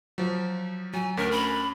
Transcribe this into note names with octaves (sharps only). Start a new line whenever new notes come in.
F3 F#3
F#3 G#5
D2 C#4 A#4 B6
B5